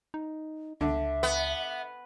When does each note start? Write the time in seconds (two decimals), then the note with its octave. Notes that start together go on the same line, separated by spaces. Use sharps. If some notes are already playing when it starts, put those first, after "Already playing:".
0.14 D#4
0.81 C#2 D3 E5
1.23 B3